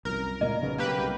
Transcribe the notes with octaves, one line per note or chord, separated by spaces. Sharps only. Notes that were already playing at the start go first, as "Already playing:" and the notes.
C2 F#2 A#4
C#2 A#2 A#3 D#5
B1 C#3 B3
A#3 G4 B4
C2